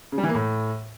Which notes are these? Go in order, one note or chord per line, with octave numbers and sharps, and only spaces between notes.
C#3
G3
E3
A#3
A2